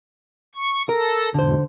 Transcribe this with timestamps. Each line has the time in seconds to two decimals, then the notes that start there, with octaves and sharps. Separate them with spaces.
0.55 C#6
0.89 A4 A#4 A#6
1.34 E2 G#2 B2 D3 C5